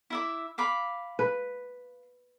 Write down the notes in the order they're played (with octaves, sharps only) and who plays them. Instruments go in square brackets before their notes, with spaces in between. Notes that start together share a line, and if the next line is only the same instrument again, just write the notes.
[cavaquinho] E4 E5 D6
F5 B5 D6
[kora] B4